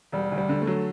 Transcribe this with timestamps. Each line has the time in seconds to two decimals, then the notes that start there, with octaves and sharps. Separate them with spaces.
0.12 E1 G3
0.32 D2
0.38 G3
0.49 D3
0.62 A3
0.67 F#3